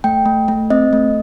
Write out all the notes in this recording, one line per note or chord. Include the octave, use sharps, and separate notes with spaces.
A3 G5
A3
A3
C4 D#5
A3